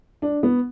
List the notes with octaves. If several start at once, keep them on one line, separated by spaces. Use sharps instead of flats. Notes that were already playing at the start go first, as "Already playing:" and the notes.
D4
B3